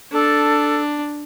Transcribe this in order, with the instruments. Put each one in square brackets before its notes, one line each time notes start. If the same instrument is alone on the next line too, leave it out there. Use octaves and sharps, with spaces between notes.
[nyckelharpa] D4 [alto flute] A4